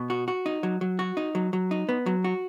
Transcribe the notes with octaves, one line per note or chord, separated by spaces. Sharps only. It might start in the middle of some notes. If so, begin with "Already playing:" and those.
Already playing: B2
F#4
F#4
D#4
F#3
F#3
F#4
D#4
F#3
F#3
D#4
B3
F#3
F#4